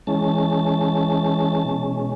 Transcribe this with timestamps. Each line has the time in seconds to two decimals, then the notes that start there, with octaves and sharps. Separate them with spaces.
0.07 E3 G#3 C#4 A5
1.65 B2 G#3 C#4